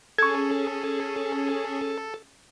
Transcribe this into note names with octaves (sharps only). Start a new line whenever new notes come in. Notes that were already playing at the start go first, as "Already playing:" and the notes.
C#4 G#4 A4 C#6 G#6